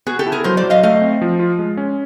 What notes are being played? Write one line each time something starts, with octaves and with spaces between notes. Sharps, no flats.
B3 F#4 G#4
G4 A4
E4
G#4 A#4
F#3 A#4 C5
C5 D5
F#3
D#5 F5
A3 D#5 F5
C4
F3
F4
G#3
C#4